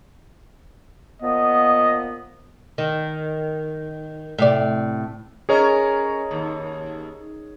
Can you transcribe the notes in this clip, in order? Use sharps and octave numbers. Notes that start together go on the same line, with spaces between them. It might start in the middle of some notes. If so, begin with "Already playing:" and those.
A#2 F3 B3 D#5
D#3
A2 C3 D5
C#4 G#4 A#4 C#5 D#5
D#2